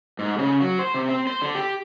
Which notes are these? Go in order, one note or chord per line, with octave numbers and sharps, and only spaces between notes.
G#2
C#3
F#3
C5
C3
C4
C5
D3
G4